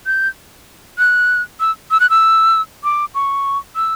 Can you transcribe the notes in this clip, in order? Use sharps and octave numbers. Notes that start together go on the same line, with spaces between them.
G6
F#6
E6
E6
F#6
E6
D6
C#6
E6